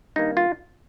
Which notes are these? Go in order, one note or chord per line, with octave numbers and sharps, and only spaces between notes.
G2 D#3 A#3 D#4
F4